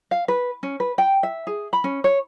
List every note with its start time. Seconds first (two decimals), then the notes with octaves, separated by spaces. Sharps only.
0.11 F5
0.28 B4
0.63 C#4
0.80 B4
0.98 G5
1.23 E5
1.47 G#4
1.73 B5
1.84 C#4
2.04 C#5